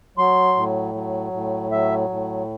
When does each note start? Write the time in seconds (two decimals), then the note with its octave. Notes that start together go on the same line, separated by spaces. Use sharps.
0.18 F#3 C6
0.56 A2
0.95 F#3
1.32 A2
1.72 F#3 E5
2.10 A2